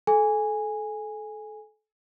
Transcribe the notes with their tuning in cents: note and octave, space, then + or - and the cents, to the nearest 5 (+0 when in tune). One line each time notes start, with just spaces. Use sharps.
A4 -30 G#5 -10